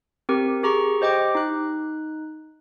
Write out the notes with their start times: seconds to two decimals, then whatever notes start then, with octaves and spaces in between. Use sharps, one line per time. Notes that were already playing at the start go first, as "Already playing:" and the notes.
0.29 C4 G4 A#4
0.63 G4 G#4 A#5 C#6
1.01 G4 C5 D#5 G5 D6
1.35 D#4 F#6